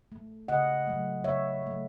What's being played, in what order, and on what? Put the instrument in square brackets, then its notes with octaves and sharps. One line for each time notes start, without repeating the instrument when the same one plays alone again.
[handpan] A3
C#3 D#5 F#5
F#3 A3
C#3 C#5 E5
F#3 A3